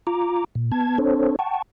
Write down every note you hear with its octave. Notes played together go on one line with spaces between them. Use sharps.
F4 A#5 D6
A#2
B3 A5 G#6
C4 D4 A4 C5 C#5
F#5 G5 A5 C#6